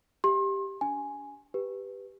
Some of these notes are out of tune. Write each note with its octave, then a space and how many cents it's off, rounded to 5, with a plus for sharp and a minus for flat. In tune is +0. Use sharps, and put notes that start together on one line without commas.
G4 +0 E5 +45 C6 +35
D4 -40 G#5 +0
G4 +5 B4 +0